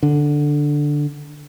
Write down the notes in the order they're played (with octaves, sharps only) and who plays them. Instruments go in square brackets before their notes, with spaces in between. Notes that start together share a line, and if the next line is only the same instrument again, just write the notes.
[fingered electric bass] D3